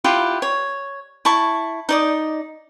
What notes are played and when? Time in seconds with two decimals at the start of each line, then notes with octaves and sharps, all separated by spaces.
0.04 E4 F4 G4 F#5
0.42 C#5
1.25 E4 A5 C#6
1.89 D#4 D5 D#6